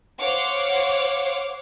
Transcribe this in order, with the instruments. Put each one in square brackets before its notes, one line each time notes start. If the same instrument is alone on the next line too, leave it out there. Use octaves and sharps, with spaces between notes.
[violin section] C5 C#5 F5 F#5 D6